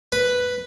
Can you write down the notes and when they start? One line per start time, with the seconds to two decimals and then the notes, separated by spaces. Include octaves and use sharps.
0.12 B4